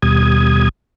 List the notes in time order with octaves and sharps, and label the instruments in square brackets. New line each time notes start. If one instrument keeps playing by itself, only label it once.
[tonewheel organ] D#2 B2 G3 D#6 G#6